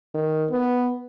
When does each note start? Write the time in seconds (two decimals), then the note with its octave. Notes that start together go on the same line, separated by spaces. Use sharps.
0.14 D#3
0.51 B3